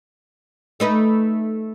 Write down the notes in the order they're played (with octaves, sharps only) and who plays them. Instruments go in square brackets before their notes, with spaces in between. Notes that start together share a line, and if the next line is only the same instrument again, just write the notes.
[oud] A3 D#4 B4